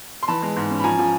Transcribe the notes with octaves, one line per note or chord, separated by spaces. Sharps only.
C6
E3 A5 B5
G#3
G#2
C#4
B5
F3 G#5 A#5
F3